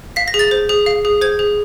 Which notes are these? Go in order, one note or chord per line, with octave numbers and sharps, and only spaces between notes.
F5 B6
A#6
G#4
A6
C5
G#4
F5
G#4
C5 G#6
G#4